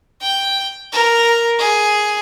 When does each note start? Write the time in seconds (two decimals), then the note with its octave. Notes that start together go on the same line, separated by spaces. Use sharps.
0.21 G5
0.93 A#4
1.59 G#4